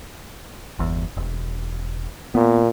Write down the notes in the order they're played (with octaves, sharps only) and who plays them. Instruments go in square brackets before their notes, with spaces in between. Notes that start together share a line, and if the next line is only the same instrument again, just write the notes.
[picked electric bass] G1 E2
E1
[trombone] A#2 [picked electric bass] B3